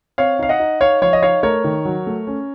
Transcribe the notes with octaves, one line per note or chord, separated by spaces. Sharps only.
C4 C#5 F5
D#4 F5
D#5 F#5
D#4
D#4 C#5 F5
F3 C#5 F5
D#5
D#4 C#5 F5
A3 A#4 C#5
D#3
F#3
A3
C#4